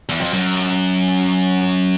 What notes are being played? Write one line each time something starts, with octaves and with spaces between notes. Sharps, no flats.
E2
F2
F#2